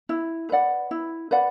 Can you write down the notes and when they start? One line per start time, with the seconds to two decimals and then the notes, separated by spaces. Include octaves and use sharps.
0.09 E4
0.50 B4 D5 F#5
0.91 E4
1.31 B4 D5 F#5